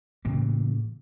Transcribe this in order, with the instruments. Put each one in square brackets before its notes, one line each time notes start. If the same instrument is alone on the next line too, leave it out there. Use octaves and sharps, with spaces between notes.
[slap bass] A2 C#3 E3 A#3